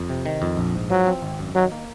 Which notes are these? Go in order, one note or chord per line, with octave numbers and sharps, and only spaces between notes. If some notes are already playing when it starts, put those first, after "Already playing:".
Already playing: F2
C3
D#3
F2
A#1
G#2
F3 F#3
C4
G#1
F#2
D#3 F#3
A#3